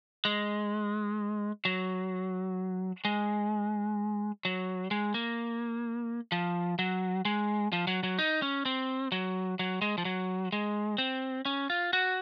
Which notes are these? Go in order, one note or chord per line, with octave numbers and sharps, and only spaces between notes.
G#3
F#3
G#3
F#3
G#3
A#3
F3
F#3
G#3
F3
F#3
F#3
D#4
C#4
C4
F#3
F#3
G#3
F3
F#3
G#3
C4
C#4
F4
F#4